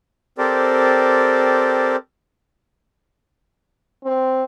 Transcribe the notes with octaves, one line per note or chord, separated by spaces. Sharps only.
C4 G4 A4 A#4 C5 D5
C4